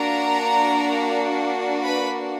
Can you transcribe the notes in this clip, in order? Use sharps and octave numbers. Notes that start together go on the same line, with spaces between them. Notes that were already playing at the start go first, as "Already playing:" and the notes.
Already playing: A#3 D4 F#4 A#4 A#5
B4 B5